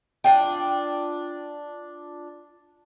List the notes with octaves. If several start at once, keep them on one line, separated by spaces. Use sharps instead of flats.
D4 F4 G5